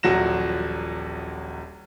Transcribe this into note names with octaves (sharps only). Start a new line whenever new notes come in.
D#1 A#1 F#3 F#4 A#6 E7